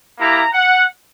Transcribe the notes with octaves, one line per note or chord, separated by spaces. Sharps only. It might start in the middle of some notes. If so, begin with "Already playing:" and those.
A#3 E4 G4 A#5
F#5